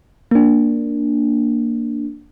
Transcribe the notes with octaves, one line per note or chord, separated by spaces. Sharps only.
A#3 D4